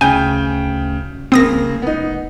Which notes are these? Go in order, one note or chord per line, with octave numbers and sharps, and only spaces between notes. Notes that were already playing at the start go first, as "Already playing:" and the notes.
D2 C#3 G5 G#5 G6
C2 C#3 A#3 C4 D#6 A#6
F1
B3 D#4